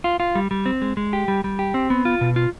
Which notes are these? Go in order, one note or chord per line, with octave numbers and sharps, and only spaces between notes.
F4
F4
G3
G3
C4
G#3
G#3
G4
G3
G3
G4
C4
B3
F4
B2
F4